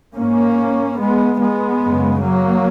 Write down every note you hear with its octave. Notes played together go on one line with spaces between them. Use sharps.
G#2 A#3 C#4
G#3 B3
G#3 B3
F#2 C#3
F#3 A#3